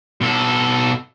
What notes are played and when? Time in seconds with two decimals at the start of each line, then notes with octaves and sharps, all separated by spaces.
0.21 B2 A4